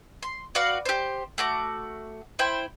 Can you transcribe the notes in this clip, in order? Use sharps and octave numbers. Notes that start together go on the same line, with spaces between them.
C6
F#4 B4 D5 F5
G4 C5
A3 F#4 D6
E4 C5 G5